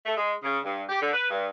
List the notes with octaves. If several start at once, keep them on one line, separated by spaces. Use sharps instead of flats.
A3
G#3
C#3
G2
G4
D3
B4
G2